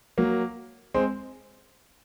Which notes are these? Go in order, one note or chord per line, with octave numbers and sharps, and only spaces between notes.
F#3 A#3
G#3 C4